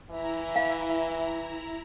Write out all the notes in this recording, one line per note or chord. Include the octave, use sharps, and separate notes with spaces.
E3 E4 E5 A#5
F5